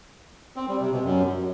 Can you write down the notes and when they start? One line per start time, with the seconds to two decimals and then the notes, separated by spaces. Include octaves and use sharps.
0.56 C4
0.68 G3
0.80 C3
0.92 B2
1.04 F#2